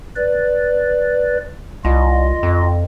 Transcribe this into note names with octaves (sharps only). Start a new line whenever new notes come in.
B4 D5
C2 F4 D#5
F2